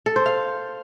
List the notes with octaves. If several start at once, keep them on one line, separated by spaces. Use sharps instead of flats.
A4
C5
F5